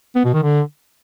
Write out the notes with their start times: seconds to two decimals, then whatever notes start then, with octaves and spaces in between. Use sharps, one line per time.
0.16 B3
0.25 B2
0.34 D#3
0.42 D3